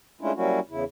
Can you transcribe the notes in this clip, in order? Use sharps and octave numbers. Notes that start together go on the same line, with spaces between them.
G#3 A3 C#4 D4 E4 F4
F#3 G3 A#3 C#4 E4 F#4
E2 C#3 E4